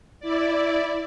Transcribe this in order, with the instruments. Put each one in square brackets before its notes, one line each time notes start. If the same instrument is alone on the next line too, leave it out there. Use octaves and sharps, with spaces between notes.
[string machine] E4 D5